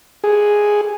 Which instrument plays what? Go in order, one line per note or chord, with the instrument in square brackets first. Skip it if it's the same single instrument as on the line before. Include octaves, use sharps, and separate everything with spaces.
[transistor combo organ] G#4